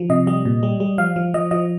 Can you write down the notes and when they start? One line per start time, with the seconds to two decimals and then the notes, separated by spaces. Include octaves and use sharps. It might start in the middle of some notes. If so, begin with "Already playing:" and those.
Already playing: F3
0.10 C3 D#5
0.27 G3 D#5
0.45 A#2
0.63 G3
0.80 G3
0.98 F3 F5
1.16 F3
1.34 F3 D#5
1.51 F3 D#5